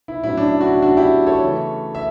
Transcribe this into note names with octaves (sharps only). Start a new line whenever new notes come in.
E4
A2 F#3 C#4 E4
D4
E4
F#4
E4
D4 F#4
E4 G4
A4 C#5
C#3 E3 A3 C#4
E5